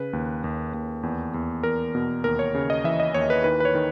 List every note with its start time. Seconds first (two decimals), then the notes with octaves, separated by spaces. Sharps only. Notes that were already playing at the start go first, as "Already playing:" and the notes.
Already playing: C#3 B4
0.13 D#2
0.44 D#2
0.74 D#2
1.03 E2
1.34 E2
1.63 E2 A#4
1.95 B2
2.24 D#2 A#4
2.39 C#5
2.54 C#3
2.70 D#5
2.84 E3 E5
3.00 D#5
3.14 D#2 C#5
3.30 B4
3.44 D#3 B4
3.60 B4
3.65 C#5
3.75 D#3